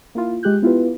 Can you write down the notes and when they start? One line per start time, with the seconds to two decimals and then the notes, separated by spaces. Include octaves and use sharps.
0.15 A#3 E4 F4
0.43 G#3 G4 F#6 G6
0.62 B3 E4 F4 G4 B4